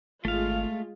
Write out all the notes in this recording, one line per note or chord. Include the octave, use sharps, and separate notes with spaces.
G#1 G#3 A3 F4 F5